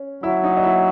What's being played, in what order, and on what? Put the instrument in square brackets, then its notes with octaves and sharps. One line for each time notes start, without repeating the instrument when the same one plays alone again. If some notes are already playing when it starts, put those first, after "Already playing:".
Already playing: [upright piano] C#4
[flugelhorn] F#3 [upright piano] E4 E5
[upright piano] D#4 D#5
D#5
E4 E5